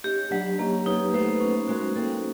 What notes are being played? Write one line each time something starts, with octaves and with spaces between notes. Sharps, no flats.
C#4 D#4 G4
F#3 D4 E4
A#3 C#4 D#4
B3 C#4 D#4
A3 B3 C5
C#4
G#3 A#3 F#4
A#3 C4 A4